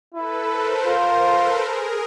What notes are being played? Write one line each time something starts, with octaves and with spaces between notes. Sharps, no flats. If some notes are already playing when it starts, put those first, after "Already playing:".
E4 A4 B4
A#4 C5
F4 A#4 C5
A4 B4
G#4 A#4